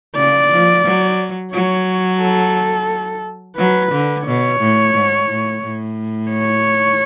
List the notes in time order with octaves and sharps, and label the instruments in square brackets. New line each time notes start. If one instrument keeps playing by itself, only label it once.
[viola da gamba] C#3 [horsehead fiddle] D5
[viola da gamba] F3
F#3
[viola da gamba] F#3 [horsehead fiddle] C#5
[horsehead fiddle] A4
[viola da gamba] F#3 [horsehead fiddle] B4
[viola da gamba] D3
[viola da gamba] B2 [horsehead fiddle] C#5
[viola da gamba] A2
G#2
A2
A2
[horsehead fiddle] C#5